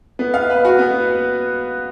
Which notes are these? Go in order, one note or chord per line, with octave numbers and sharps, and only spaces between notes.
B3
F5
B4
F#4
B3